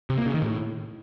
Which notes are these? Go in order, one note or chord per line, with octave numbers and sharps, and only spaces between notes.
C3
A#3
C#3
D#3
A2